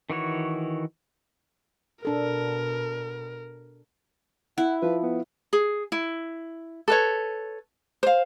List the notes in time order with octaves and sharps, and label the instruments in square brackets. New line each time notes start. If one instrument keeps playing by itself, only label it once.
[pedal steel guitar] D#3 E3 F#4 C#5
[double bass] B2 [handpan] D4 A4 [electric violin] A#4
[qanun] E4 [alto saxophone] F#5
[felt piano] F3 [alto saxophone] B4
[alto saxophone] B3
[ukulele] G#4
E4
A4 B4 C#5
C5 F5